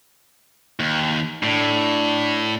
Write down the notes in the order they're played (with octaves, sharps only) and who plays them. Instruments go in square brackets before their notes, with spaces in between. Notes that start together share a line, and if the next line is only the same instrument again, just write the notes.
[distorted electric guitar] D#2
[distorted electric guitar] A2 [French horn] D4